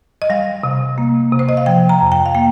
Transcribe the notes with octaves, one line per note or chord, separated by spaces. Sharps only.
D#5
G3 F5
C3
A#3
C3
C5
D#5
F5
F3 G5
A#5
F2
G5
F5
A#3 G5